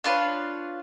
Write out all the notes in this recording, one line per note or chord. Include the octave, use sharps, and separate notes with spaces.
D4 F4 B4 C#5